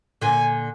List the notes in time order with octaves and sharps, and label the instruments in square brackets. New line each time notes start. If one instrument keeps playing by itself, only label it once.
[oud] A#2 D3 [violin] G#5